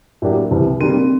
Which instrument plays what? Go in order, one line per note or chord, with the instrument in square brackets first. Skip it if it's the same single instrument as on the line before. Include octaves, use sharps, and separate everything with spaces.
[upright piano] A2 F#3 A#3 D4 G4
C2 C3 E3
[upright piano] D#3 G3 A#3 [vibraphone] C4